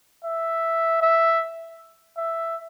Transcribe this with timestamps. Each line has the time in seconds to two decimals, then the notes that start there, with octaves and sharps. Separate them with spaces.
0.24 E5
1.02 E5
2.17 E5